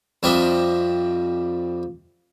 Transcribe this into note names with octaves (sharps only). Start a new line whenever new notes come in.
F2 G3 C4 D4 D#5 E5